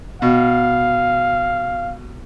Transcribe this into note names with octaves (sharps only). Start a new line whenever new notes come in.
B2 F5